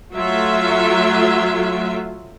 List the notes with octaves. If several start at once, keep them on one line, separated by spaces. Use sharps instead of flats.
F#3 A3 F4 E5